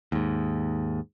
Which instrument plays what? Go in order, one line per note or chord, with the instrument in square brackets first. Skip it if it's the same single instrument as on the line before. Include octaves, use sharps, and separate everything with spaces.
[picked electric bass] D#2 G#2